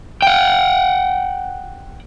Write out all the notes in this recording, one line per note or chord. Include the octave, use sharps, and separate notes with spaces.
F#5 G5